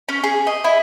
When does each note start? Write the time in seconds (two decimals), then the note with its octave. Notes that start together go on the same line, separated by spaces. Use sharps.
0.09 C#4
0.24 G#4
0.47 D#5
0.64 E4